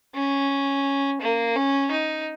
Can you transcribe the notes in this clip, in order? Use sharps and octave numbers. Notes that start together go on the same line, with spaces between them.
C#4
A#3
C#4
D#4